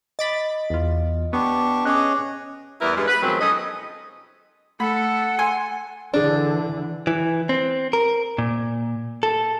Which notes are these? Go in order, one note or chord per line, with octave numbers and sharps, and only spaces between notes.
D#5 B5 D6 A6
E2 F4
B3 D4 G4 C#6
C#4 G#4 C#5 D#5 D6 F#6
E2 G3 E4 A#4 B4
G2 G#3 B4
B4
B2 D#3 F3 F#3 G#3 C4
C#4 D#4 A4 D#5
A3 A4 F#5 B5
G#5 C6
D3 E3 D4 G#4
E3
C4
A#4
A#2
A4